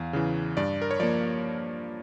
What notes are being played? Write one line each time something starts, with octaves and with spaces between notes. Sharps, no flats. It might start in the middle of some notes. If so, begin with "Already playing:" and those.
Already playing: E2 F5
C#3 E3
G2 D5
A#4
C#5
F3 A#3 D5